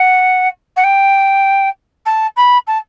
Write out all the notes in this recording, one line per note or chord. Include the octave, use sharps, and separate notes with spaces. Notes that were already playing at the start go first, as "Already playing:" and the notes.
Already playing: F#5
F#5
G5
A5
B5
A5